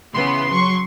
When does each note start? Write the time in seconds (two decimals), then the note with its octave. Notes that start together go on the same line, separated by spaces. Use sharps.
0.14 C#3 E3 B3 C6
0.51 F#3 C#6